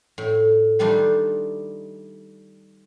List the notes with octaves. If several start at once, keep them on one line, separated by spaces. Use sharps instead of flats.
A2
D#3 G3 A3 D4 D#4 F4